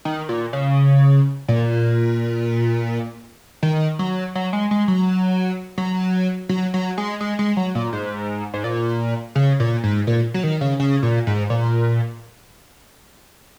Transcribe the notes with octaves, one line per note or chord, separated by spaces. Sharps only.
D#3
A#2
C#3
A#2
D#3
F#3
F#3
G#3
G#3
F#3
F#3
F#3
F#3
G#3
G#3
G#3
F#3
A#2
G#2
G#2
A#2
C#3
A#2
G#2
A#2
F#3
D#3
C#3
C#3
A#2
G#2
A#2